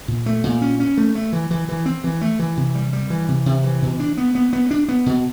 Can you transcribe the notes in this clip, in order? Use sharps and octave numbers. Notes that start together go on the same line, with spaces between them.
A#2
A3
A#2
C#4
C#4
A3
A3
E3
E3
E3
C4
E3
A3
E3
C3
G3
G3
E3
C3
C3
E3
B2
D4
B3
B3
B3
D4
B3
B2